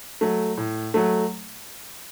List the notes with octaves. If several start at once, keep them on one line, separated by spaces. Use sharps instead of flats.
F#3 A3
A2
F#3 A3